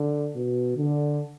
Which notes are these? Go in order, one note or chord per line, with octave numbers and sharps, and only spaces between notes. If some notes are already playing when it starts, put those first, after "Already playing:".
Already playing: D3
B2
D3